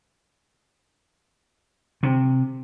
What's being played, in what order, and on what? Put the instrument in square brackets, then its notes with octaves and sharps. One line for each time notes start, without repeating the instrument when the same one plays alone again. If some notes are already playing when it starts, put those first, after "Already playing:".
[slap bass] C3